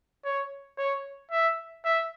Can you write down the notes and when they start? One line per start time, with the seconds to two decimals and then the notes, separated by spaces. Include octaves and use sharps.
0.25 C#5
0.78 C#5
1.31 E5
1.85 E5